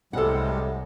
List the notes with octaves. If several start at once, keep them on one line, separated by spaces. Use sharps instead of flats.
C2 A2 C3 G3 G#3 A4 F#5